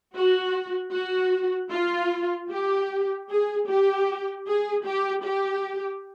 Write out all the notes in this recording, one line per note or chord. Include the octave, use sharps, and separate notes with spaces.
F#4
F#4
F4
G4
G#4
G4
G#4
G4
G4